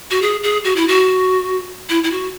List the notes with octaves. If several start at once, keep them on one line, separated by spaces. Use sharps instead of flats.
F#4
G#4
G#4
F#4
E4
F#4
E4
E4
F#4